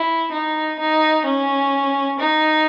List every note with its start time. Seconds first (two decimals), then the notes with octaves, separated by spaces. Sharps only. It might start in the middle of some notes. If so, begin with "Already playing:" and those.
Already playing: E4
0.32 D#4
0.79 D#4
1.25 C#4
2.19 D#4